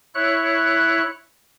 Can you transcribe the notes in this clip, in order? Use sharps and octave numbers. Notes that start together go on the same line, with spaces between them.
E4 C#5 F#6